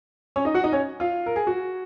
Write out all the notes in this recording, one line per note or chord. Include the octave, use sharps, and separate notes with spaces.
C#4 C#5
D#4 D#5
F#4 F#5
D#4 D#5
C#4 C#5
F4 F5
A#4
G#4
F#4